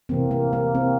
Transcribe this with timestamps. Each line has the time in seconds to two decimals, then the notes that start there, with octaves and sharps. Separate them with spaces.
0.09 C3 E3 A#3 C4
0.31 A#3
0.53 A#3
0.75 C4